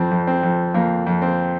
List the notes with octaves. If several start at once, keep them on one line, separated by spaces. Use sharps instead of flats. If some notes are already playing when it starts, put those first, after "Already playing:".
Already playing: F2 C4
F2
C4
F2
F2 A#3
F2
C4